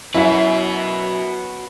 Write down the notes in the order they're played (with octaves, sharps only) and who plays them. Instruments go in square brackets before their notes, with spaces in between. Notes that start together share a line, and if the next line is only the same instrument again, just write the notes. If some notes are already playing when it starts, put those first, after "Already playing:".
[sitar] F#2 [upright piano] E4 E5 [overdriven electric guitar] F#4 B4